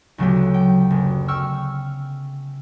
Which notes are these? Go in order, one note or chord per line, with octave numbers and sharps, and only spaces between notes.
D2 C#3 F#3 A3 B3 G4
G5
F#1
G5 C#6 E6 F6